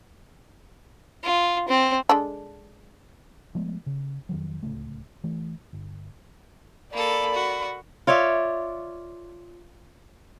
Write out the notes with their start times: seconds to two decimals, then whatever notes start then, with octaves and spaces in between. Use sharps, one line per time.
1.23 F4
1.68 C4
2.09 G#3 D4 A4
3.55 F3 G#3 A3 B3
3.86 C#3
4.29 F2 D#3 F#3
4.63 D1 C#2 A3
5.24 E3 A3
5.73 G1
6.93 A#3 A4 D5 B5
7.34 F#4
8.07 F4 C#5 D5 E5